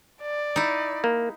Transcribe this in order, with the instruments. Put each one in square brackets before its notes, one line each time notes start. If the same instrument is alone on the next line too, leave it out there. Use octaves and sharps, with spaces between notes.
[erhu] D5
[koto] D#4 E4
[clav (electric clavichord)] A#3